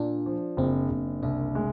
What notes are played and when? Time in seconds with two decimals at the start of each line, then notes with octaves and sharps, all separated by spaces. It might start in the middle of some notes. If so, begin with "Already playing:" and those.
Already playing: A#2 D4
0.26 F3
0.57 F#1 C4
0.90 F#1
1.23 C2 D4
1.55 G#3